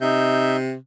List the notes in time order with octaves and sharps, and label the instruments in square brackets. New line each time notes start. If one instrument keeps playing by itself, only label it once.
[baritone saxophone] C3 [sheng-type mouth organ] D#4 E5 G6